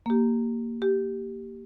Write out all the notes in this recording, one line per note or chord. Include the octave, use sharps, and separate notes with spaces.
A#3 G4
G4